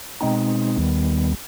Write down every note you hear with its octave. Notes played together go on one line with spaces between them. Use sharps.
B2 G#3 C4 D#4
D#2 D#3 G3 B3